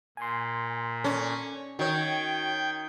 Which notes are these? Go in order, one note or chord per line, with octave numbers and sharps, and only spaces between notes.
A#2 G#5 C6
C#4 A4 D5
D#3 F#4 C#5 G5 G6 G#6